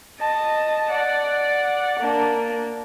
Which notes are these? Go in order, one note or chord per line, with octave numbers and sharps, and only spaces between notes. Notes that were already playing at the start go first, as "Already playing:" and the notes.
D#5 A5
D5 F#5
A#3 D4